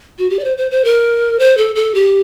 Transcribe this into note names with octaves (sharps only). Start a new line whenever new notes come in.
F#4
G4
D5
C5
C5
C5
A#4
C5
A4
A4
G4